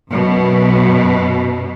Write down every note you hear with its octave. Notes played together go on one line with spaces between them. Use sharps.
F#2 B2